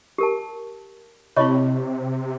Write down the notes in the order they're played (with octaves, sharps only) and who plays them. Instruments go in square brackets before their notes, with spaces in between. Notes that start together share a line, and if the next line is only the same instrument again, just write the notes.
[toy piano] G4 A#4 A5
[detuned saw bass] C3 [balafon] C4 E4 B5 [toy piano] C#5 D#5 C#6